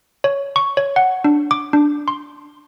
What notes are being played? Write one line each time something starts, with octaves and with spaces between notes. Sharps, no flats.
C#5
C#6
C#5
F#5
D4
D6
D4
C6